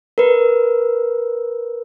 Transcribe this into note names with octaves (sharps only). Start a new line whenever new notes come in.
A#4 B4